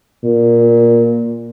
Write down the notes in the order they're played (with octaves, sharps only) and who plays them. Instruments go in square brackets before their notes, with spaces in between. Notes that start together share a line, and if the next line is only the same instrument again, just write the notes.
[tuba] A#2